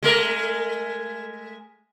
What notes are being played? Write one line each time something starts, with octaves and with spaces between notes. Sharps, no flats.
G#3 A3 A#4